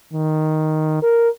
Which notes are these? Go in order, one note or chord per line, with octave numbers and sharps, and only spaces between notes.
D#3
A#4